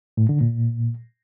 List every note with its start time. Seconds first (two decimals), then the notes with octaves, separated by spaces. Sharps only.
0.17 A2
0.29 D3
0.41 A#2